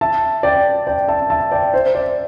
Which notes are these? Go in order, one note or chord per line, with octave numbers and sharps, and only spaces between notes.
E5 A5
D5 G5
D5 G5
E5 A5
E5 A5
D5 G5
C5 E5
D5